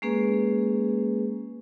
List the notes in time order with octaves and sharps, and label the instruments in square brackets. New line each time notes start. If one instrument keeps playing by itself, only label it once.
[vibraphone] G#3 A#3 C#4 G#4 B4